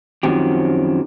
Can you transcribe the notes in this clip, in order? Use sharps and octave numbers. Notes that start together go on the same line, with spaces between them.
F#2 D#3 F3 F#3 C4 G4